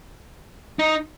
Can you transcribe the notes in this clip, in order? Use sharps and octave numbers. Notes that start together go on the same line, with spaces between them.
D#4